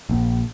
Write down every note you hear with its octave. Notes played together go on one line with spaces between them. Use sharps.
A#1